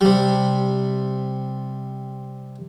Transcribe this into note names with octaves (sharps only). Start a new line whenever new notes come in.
C3 G3